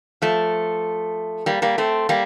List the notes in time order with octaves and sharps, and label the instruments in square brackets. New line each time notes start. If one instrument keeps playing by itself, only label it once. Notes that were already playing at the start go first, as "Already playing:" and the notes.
[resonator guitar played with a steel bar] F3 A3
G3 A#3
G3 A#3
A3 C4
G3 A#3